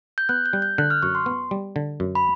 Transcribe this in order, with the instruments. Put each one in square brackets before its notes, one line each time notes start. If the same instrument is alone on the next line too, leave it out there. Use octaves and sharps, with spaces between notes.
[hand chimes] G6
[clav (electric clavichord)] B3 [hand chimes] F#6
[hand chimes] G6
[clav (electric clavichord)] G3
[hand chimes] G6
[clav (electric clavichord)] D3 [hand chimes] F#6
[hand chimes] F6
[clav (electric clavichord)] F#2 [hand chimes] C#6
[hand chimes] C6
[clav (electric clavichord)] B3
G3
D3
F#2
[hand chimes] B5